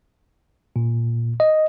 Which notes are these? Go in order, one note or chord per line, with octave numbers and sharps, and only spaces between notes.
A#2
D#5